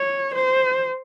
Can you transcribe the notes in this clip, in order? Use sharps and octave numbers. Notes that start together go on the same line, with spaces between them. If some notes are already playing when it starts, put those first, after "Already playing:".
Already playing: C#5
C5